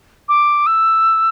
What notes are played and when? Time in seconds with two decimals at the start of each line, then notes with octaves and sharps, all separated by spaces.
0.29 D6
0.67 E6